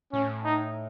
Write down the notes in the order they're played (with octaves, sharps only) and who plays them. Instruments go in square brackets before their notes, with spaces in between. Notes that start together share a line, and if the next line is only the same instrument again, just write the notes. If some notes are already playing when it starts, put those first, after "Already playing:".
[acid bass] A2 [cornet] C#4
[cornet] D#4